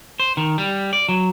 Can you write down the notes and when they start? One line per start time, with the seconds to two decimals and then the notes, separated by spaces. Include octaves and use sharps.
0.20 C5
0.37 D#3
0.58 G3
0.93 D5
1.09 F#3